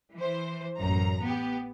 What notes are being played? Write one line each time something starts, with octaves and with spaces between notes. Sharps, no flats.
E3 C5
A1 F#2 A#5
B3 G4